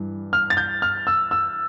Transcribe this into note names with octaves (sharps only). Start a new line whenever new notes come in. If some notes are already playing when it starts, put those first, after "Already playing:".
Already playing: G2 E3
F6
A6
G6
F6
E6
E6